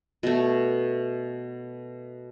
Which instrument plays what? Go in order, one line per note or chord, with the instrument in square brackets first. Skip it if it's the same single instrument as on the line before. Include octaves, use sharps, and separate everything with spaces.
[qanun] B2 A3